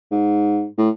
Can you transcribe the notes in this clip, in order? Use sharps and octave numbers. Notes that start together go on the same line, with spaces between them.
G#2
A2